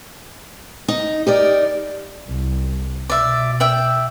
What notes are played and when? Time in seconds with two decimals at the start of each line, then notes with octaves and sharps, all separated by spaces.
0.88 D#4
1.27 D#4 G4 A#4 D5
2.27 C2
3.10 B2 D5 E5
3.60 D5 E5 G5